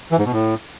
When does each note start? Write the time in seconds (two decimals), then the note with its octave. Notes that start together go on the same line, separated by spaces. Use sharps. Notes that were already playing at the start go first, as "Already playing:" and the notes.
0.11 E3
0.19 G#2
0.26 B2
0.33 A2